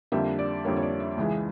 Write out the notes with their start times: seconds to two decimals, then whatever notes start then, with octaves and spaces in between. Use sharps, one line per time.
0.12 F2 D3 G3 A#3 E5
0.39 D5
0.65 F2 D3 G3 A#3 C#5
0.77 C#5
0.82 D5
1.00 E5
1.17 C#2 C#3 E3 G#3 E5